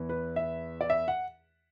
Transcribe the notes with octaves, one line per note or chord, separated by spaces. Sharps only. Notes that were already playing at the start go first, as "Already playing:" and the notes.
Already playing: E2 E3 B3
B4
E5
D5
E5
F#5